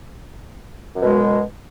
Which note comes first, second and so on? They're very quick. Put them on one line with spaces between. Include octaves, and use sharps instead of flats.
F#2 B2 G#3